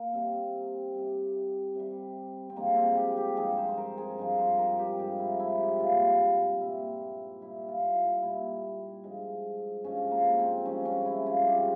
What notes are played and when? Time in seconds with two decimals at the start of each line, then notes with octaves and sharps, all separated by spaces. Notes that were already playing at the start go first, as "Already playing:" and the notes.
Already playing: A#3 A#4
0.13 C3 G3 C4
0.94 C3 G3
1.75 C3 G3
2.50 C4
2.56 G2 F3 G#3 A#3
2.76 C4
2.97 G4
3.17 G4
3.37 G2 F3 G#3 G#4
3.57 C5
3.69 C5
3.78 A#4
3.98 G#4
4.18 G2 F3 G#3
4.39 C5
4.59 A#4
4.79 G4
4.99 G2 F3 G#3 G4
5.19 E4
5.40 E4
5.60 G4
5.80 A#2 G3 F4
6.61 A#2 G3 E4
7.41 A#2 G3 E4
7.69 F4
7.95 E4
8.22 A#2 G3 E4
9.04 G2 F3 G#3
9.84 G2 F3 G#3 C#4
10.11 A#3
10.38 C4
10.65 G2 F3 G#3 C#4
10.85 C#4
11.06 E4
11.26 F4
11.46 G2 F3 G#3 G4